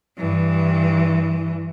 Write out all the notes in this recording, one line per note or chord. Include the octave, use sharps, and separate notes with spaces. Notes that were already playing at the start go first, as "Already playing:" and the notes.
G2 E3